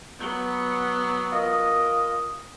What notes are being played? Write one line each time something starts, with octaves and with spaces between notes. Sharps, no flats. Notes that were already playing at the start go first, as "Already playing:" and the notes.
F#3 B3
F4 A#4 D#5